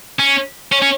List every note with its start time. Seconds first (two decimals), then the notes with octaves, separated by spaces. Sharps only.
0.19 C#4
0.72 C#4
0.82 C#4